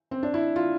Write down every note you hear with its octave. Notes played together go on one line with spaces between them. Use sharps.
C4
D4
E4
F4